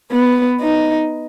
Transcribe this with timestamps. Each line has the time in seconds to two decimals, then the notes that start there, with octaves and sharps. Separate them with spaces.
0.12 B3
0.61 D#4